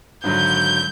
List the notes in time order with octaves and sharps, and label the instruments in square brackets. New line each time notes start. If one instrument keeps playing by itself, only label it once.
[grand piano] G#1 D3 F#3 [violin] G6